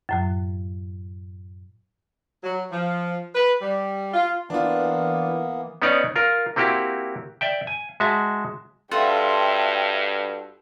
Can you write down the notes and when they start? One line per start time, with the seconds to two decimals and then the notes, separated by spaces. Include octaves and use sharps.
0.09 F#2 A2 F#3
2.44 F#3
2.71 F3
3.35 B4
3.61 G3
4.14 F4
4.50 E3 A#3 B3 D4 F4
5.82 B3 C#4 D#4 C#5 D5
6.16 F4 A#4
6.56 A#3 C4 E4 F#4 G4
7.41 D5 E5 G5
7.67 G#5
8.00 G#3 F#4 E5 A5
8.91 G2 F4 F#4 A4 E5 G5